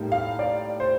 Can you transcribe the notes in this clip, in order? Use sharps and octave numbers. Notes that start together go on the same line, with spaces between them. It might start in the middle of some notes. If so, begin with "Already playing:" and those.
Already playing: A2 G3 A#3 D#4
F5
D5
C5